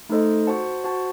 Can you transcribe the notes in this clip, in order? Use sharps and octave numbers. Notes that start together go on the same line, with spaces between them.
A3 D#4 A4 C5 D#5
F#4 C5 F#5 A5
F#4 C5 F#5 A5